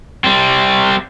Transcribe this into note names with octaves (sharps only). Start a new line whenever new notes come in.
G3 C4